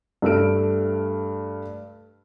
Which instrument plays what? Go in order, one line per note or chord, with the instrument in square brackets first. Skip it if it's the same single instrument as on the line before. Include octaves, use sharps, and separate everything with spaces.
[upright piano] G2 A3 E6 F6 D7